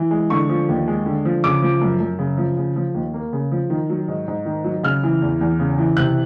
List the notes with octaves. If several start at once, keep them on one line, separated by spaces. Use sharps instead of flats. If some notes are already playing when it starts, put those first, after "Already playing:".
Already playing: E3
G#3
D3 C#6
F3
D#2
G#3
D3
F3
C#3 D6
F3
F#2
F#2
C#3
F3
C#3
F3
D#2
A#3
C#3
F3
D#3
F#3
G#2
G#2
D#3
F#3
C#3 F6
E3
E2
E2
C#3
E3
C3 F#6